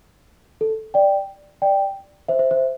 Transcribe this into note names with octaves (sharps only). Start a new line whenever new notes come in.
A4
D5 G5
D5 G5
C5 E5
C5 E5
C5 E5